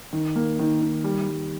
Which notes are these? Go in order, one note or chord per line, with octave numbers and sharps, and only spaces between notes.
D#3
A#3
D#3
D#3
G3
G3